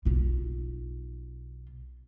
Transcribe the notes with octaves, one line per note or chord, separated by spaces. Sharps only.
B1 F4